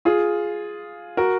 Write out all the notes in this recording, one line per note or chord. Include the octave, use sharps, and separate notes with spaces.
F4 G#4
F#4 A#4